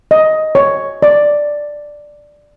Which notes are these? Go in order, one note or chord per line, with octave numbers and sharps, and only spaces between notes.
D#5
C#5
D5